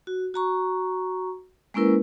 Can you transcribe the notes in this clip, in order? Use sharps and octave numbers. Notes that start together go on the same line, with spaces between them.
F#4
F#4 A#5 C#6
G#3 A#3 C#4 E4 A#4 B4